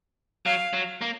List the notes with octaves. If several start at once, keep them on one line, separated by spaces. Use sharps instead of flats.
F#3 F5
F#3
A#3